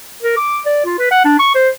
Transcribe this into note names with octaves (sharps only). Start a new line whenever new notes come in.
A#4
D6
D5
F4
B4
F#5
D4
C#6
C5